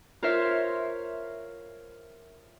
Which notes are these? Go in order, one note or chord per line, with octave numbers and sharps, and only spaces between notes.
F4 A#4 C5 C#5 E5 F5